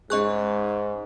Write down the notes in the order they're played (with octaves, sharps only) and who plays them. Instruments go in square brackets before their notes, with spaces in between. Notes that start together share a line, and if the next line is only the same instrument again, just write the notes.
[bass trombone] G#2 [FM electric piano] G#3 C#4 G#4 [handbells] D#5 C#6 F#6